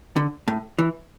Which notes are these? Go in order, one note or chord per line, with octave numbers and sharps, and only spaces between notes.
D3
A2
E3